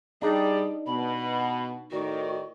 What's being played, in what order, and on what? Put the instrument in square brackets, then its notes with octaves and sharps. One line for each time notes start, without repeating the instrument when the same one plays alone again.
[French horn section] G3 D5 [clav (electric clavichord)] D4 D#4 [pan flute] G#4
[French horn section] B2 [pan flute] B5
[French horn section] A2 D#3 D5 [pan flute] F#4